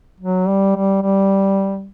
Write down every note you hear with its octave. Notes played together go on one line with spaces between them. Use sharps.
F#3
G3
G3
G3